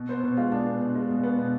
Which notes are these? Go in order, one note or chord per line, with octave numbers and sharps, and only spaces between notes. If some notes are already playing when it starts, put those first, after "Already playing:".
Already playing: B2
B3 C5
B2 C5
G#3 F4
B2 D4
B3
B2
G#3
B2
B3
B2